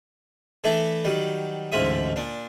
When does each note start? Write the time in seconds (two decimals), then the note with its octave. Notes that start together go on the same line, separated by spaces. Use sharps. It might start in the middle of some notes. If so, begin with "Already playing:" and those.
0.64 E3 A3 D4 E4 A4
1.04 D#3 F#3 G3
1.72 A1 D2 G#2 F3 E5 D#6
2.16 A#2 D4